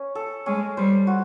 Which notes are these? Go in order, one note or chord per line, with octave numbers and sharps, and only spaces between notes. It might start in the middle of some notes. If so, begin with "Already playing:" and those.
Already playing: C#4
A4
G#3 C#4
G3 C5
F#4